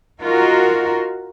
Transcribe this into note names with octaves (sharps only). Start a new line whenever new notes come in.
D#4 F4 F#4 A#4